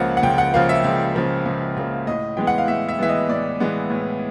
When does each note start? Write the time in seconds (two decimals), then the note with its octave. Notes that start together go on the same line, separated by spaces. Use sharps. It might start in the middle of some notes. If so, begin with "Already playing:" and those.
Already playing: C#2 C#3 F3 A#3 F#5
0.17 F#5
0.23 C#2 G5
0.38 F#5
0.54 C#3 F3 A#3 F5
0.69 E5
0.84 C#2
1.15 C#3 F3 A#3
1.46 C#2
1.77 C#3 F3 A#3
2.07 A2 D#5
2.37 E3 G#3 B3 G5
2.47 F#5
2.58 F5
2.68 A2 E5
2.89 E5
2.99 E3 G#3 B3 E5
3.09 D#5
3.29 A2 D5
3.60 E3 G#3 B3
3.90 A2